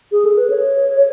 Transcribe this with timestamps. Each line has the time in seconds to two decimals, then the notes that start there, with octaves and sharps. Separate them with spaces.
0.12 G#4
0.25 A4
0.37 B4
0.50 C#5